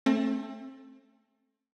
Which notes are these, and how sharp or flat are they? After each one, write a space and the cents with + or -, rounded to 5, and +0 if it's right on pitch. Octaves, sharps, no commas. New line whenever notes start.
A3 +0 C4 +35